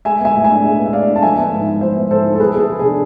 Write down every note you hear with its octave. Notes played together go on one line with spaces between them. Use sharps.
G#3 E5 G#5
B3 E5 G#5
A2
D4 E5 G#5
G#3
B3
E5
A2 D5 F5
D4
A5
F3 E5 G#5
B3
G#2
E4
F3 C5 E5
B3
G#2 A4 C5
E4
A4
F3 G#4 B4
B3 G#4 A4
C3
D4 G#4